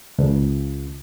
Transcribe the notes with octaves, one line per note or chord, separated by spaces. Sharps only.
C#2